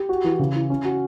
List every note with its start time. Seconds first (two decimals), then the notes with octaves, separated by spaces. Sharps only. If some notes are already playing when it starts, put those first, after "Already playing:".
Already playing: G4
0.09 F#4
0.24 E3
0.39 C#3
0.55 E4
0.70 C#4
0.85 F#4